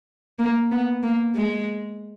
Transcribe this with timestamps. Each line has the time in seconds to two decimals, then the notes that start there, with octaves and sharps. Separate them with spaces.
0.39 A#3
0.71 B3
1.03 A#3
1.35 G#3